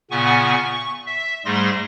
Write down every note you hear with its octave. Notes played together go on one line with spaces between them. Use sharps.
A#2 C#3 B3 F#5 G#5 C#6
C#6
E5
G#2 G3 A3 G#4 C6 A#6